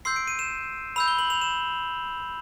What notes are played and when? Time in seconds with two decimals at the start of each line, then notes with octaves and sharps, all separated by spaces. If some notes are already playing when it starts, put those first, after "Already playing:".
0.05 C6 E6 G6 C7
0.16 D7
0.27 D#7
0.39 E7
0.96 B5 E6 G6 F7
1.08 G7
1.19 F#7
1.30 F7
1.41 E7